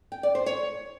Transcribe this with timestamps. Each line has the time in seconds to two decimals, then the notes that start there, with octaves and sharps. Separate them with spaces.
0.12 G5
0.23 D5
0.35 C5
0.46 C#5